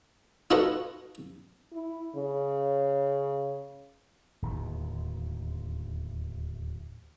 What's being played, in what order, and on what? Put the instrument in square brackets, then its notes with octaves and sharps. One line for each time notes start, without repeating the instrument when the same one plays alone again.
[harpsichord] D#4 F4 F#4 A4 B4 D#5
[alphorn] E4
C#3
[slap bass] D1 D#2 D#3